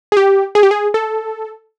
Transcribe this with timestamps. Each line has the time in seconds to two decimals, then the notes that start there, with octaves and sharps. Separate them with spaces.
0.12 G#4
0.17 G4
0.55 G#4
0.63 G4
0.71 G#4
0.94 A4